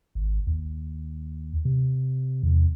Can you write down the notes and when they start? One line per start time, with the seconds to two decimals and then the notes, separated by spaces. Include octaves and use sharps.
0.15 G#1
0.47 D#2
1.65 C3
2.43 E2